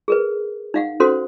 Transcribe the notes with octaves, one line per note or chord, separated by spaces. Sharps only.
G#4 A#4 B4
D#4 F5 F#5
C#4 F#4 A4 C5 F#5 C6